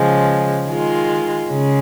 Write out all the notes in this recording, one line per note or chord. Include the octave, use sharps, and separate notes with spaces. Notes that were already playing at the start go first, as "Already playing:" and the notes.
Already playing: C#3 F3 G#3
D#3 G#3 F4
C#3 G#3